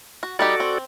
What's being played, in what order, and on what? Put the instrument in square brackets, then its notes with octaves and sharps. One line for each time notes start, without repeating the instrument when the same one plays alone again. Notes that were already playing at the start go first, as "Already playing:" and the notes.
[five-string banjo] F#4
[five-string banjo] G3 D#4 G4 [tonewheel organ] F#4 A4 D5
[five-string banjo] C4